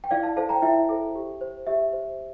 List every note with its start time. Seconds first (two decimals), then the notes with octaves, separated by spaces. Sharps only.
0.04 G5
0.11 E4 D5 F5
0.23 F5 A5
0.36 A4 C5 F5 A5
0.49 G5 A#5
0.62 E4 E5 G5
0.89 A4 C5
1.16 G4
1.41 C5
1.67 G4 E5
1.93 C5